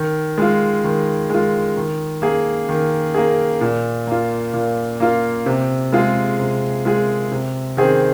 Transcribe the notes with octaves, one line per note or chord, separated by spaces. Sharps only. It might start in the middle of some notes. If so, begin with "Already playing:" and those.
Already playing: D#3
G#3 F4
D#3
G#3 F4
D#3
A#3 G#4
D#3
A#3 G#4
A#2
A#3 F4
A#2
A#3 F4
C3
G#3 F4 G#4
C3
G#3 F4 G#4
C3
D#3 C4 G#4